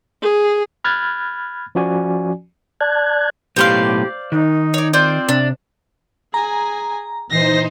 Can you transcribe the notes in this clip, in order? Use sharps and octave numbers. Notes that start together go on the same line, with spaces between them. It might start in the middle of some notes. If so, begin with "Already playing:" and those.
G#4
B5 F6 F#6 G#6 A6
F3 C#4 F#4 D5 G#5
D5 A5 F#6 G#6
B1 A2 G4 C5 D5 F5 C6
D#3 D#4
C#5 D5
C4 F4 C5 D5
C3 D4
G#4 G#5 A#5
A#2 E3 D#4 C5 A#6 C7